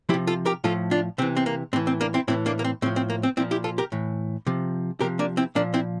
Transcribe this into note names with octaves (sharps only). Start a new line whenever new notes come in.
C3 F3 E4 G4
F4 A4
G4 A#4
A2 F3 F4 A4
D4 F4
C3 E3 C4
C4
A#3
A2 E3 C4
C4
A#3 D4
C4 E4
A2 E3 C4 E4
A#3 D4
A#3
C4
A2 F3 C4
C4
A#3
C4
A#2 F3 C4 E4
E4 G4
F4 A4
G4 A#4
A2 E3
C3 F3
C3 F3 G4 A#4
A#3 D4
C4 E4
A#2 F3 A#3 D4
C4 E4